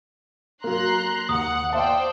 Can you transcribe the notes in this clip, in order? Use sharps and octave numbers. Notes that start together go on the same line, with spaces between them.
F#3 A#3 A#5 C6 F#6
D#2 F#5 D#6
C5 D5 E5 F5 G5 A5